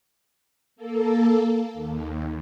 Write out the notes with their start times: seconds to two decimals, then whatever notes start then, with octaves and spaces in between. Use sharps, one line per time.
0.76 A#3 A4
1.74 D#2